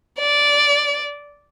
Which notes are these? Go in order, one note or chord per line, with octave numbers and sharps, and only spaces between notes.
D5